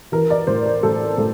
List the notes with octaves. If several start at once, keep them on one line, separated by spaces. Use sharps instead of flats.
E3 A#4
D5
A2 C5
A#4
A2 A4
A2 A4